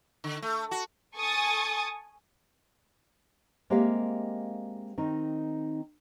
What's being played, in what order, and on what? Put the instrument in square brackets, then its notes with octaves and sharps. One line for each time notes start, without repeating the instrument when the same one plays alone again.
[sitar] D3
A3
F#4
[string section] A4 G#5 C#6 D#6 A6
[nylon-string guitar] G#3 A#3 C4 G4 E5 F5
D#3 C4 D#4